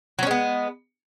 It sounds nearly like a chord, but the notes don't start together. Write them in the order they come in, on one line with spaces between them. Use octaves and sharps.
F#3 C#4 G#3 B3